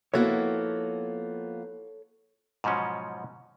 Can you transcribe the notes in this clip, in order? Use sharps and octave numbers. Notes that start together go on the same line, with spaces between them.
F3 A#3 B3 E4 F#4 A4 C#5
G#2 B2 F3 F#3 C#4